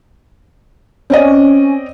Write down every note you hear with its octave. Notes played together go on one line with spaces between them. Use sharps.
C4 C#4 D5 D#5